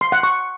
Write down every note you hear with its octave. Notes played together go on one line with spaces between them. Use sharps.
C6
F#5
C#6